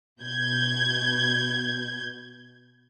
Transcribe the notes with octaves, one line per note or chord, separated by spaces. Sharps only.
B2 G6 G#6